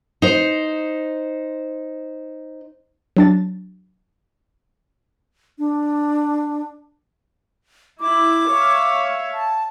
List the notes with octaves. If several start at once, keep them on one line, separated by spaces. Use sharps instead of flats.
D#4 C5
F#3 D4 A6
D4
E4 D6
C#5 E5 F5
A5